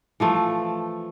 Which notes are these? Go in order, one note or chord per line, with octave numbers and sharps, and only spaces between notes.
E3 F3 A3